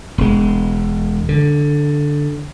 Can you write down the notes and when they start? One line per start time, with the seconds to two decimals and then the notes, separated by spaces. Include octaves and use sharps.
0.18 E1 G#3
1.29 D3